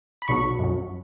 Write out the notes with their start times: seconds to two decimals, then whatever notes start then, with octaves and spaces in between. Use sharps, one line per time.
0.22 B5
0.28 B1 B2 F#3 C#6
0.59 F#2 F#3